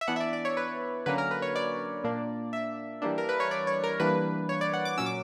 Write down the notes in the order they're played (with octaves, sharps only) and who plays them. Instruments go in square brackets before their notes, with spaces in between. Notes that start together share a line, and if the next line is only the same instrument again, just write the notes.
[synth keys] E5
E3 B3 D4 F#5
E5
D5
D5
C#5
B4
D3 F#3 A#3 C#4 B4
A#4
B4
C#5
D5
A#2 A#3 D4
E5
E3 G3 A#3 D4
A#4
B4
C#5
D5
C#5
A#4
E3 G3 A#3 D4 B4
C#5
D5
F#5
D6
A#2 F#3 C#4 E6
D6